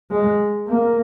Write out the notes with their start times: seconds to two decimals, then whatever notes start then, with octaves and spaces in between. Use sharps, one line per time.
0.10 G#3
0.68 A#3